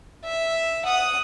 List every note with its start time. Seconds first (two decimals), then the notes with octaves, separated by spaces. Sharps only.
0.24 E5
0.85 F#5 D#6